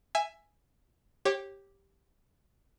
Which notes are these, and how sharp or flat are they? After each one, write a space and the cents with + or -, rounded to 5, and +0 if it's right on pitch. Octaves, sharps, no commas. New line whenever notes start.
E5 +10 G#5 +0
G4 +0 C#5 -30